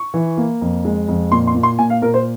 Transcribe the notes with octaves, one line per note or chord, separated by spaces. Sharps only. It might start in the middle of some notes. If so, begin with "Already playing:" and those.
Already playing: C#6
E3
A#3
F2
G#3
F2
A#2 C6
C6
A#2
C6
A#2 G#5
F5
A#2 A#4
C5